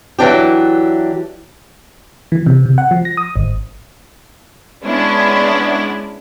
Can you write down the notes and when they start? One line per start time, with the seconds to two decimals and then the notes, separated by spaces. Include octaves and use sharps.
0.19 E3 F#3 D4 G4
2.32 E3
2.46 C3
2.66 C3
2.78 F#5
2.91 F3
3.05 A#6
3.17 D#6
3.36 G#1
4.84 G#3 B3 C#4 D4 E4